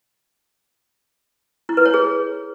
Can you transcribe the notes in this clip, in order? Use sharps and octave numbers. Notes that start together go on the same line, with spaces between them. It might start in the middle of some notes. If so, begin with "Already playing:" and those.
E4
B4
C#5
G#4